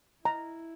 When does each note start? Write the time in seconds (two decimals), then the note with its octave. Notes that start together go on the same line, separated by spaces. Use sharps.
0.25 E4 A#5